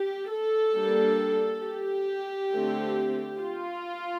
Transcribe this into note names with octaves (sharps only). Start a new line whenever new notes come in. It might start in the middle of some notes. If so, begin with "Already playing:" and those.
Already playing: G4
A4
G3 A#3 D4
G4
D3 A3 C4
F4